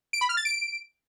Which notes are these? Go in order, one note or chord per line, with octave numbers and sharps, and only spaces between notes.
D7
B5
F6
A6
D7